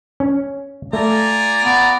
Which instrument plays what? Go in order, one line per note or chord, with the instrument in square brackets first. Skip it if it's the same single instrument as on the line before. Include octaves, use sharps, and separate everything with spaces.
[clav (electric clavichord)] C#4
[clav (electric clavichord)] A3 [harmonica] F4 G#5 A#5 [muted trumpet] D5
[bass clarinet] B3 [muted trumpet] D5